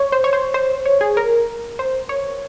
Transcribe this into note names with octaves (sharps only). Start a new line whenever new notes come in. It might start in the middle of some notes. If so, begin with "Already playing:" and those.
Already playing: C#5
C5
C#5
C5
C5
C#5
G#4
A#4
C5
C#5